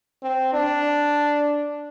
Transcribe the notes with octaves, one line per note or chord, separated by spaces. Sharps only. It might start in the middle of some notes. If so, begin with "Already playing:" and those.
C4
D4